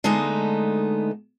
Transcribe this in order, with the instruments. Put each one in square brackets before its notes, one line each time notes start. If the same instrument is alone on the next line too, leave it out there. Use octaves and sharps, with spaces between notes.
[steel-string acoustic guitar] D3 G#3 A3 B3 D#4